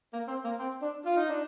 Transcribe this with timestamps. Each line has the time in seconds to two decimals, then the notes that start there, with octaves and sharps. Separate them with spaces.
0.13 A#3
0.28 C4
0.44 A#3
0.59 C4
0.82 D4
1.06 F4
1.17 D#4
1.29 D4